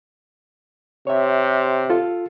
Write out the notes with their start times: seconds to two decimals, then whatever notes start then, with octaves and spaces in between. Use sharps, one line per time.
1.07 C3 C#5 E5
1.90 F4 A4